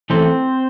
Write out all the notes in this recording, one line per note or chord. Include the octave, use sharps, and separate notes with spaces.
E3 A3 C4 E4 A4 C5